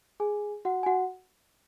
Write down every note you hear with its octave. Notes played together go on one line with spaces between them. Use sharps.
G#4 G#5
F#4 F#5
G#5
F#4 F#5